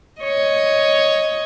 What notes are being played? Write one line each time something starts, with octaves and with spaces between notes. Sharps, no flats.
C#5 D#5